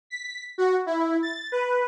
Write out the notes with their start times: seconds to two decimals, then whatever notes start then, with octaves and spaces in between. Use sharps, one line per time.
0.10 B6
0.58 F#4
0.86 E4
1.22 A6
1.52 B4